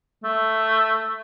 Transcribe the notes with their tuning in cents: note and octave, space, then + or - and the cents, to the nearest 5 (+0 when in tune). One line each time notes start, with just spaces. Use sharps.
A3 +5